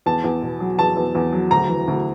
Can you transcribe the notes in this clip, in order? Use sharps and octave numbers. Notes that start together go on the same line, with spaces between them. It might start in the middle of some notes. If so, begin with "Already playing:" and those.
E2 A5
E2
B2
F#3
E2 A5
E2
E2
F#3
D2 A#5
E3
D2